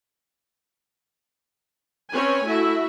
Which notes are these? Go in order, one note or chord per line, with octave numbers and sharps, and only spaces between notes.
C4 C#4 B4 C#5 G#5
A3 E4 F#4 E5